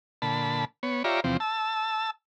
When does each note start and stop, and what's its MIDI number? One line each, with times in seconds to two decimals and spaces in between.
0.22 0.65 46
0.22 0.65 50
0.22 0.65 81
0.22 0.65 83
0.83 1.03 59
0.83 1.03 73
1.04 1.20 65
1.04 1.20 67
1.04 1.20 73
1.04 1.20 74
1.04 1.20 76
1.04 1.20 82
1.24 1.37 40
1.24 1.37 48
1.24 1.37 53
1.24 1.37 60
1.40 2.10 81
1.40 2.10 88